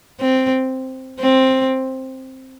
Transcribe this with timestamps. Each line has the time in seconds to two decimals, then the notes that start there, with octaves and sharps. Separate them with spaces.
0.20 C4
1.19 C4